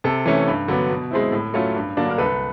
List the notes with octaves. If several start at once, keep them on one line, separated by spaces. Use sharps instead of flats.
C3 A4
E3 A3 C#4
G2
D3 F#3 B3
B2
G#3 C4 E4
A2
F#3 A3 C#4 F4
G2
D3 F#3 A#3 D4
A#4
C2 A4 B4